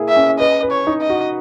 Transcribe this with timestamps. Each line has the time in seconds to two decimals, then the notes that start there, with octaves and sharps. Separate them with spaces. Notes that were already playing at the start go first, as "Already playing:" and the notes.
Already playing: A#3 E4 G#4
0.09 E5
0.17 C#4
0.39 B4 D#5
0.63 B4
0.71 C#5
0.87 D#4
1.02 D#5
1.10 F#4